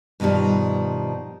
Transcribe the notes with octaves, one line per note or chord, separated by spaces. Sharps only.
G2 B2 D#3 F3 G3